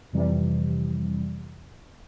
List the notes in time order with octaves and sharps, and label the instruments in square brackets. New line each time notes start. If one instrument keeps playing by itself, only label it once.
[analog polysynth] F2 C3 E3 G3